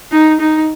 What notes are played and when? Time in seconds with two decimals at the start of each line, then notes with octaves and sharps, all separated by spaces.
0.12 D#4
0.40 D#4